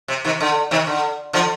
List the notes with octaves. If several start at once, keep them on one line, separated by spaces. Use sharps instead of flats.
C3
C3 D#3
D3
C3 D#3
D3
D3 F3